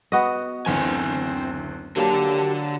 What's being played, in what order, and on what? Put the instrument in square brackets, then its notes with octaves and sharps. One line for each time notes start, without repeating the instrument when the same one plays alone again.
[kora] B3 F#4 D#5
[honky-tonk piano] F#1 D2 E3 [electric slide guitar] C4 G#5
[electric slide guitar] D3 A5 [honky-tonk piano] F#3 A#3 D4 [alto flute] G4